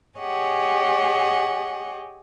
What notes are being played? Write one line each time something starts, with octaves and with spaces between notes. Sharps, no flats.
G4 G#4 C#5 D#5 F#5 G#5